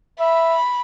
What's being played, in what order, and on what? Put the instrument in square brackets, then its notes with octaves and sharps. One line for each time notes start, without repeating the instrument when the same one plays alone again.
[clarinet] E5 [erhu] B5